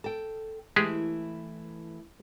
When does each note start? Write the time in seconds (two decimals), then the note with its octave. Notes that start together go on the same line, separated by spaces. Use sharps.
0.04 A4 G5
0.76 E3 G#3 A3 E4 G4 G#4